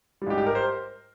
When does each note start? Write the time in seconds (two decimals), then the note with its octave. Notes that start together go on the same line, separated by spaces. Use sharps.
0.22 G3
0.27 G#2 G4
0.38 G4
0.46 A#4
0.55 C5